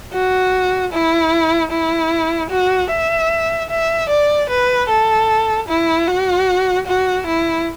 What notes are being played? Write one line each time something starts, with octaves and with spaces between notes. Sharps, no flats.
F#4
E4
E4
F#4
E5
E5
D5
B4
A4
E4
F#4
F#4
E4